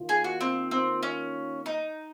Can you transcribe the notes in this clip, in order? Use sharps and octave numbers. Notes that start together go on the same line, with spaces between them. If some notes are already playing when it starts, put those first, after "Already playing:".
Already playing: D#3 A#3 F4
G#4
F#4
C4
C4
C#4
D#4